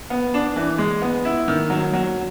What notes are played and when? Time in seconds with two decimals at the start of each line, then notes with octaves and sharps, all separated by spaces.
0.10 B3
0.34 D4
0.56 E3
0.78 G#3
1.02 B3
1.25 E4
1.48 D#3
1.70 F#3
1.93 F#3